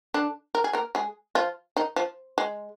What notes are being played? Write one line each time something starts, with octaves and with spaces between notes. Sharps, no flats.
D3 D4
A#4
G#4
A#3 A#4
G#3 G#4
F3 F4
D#3 D#4
F3
G#3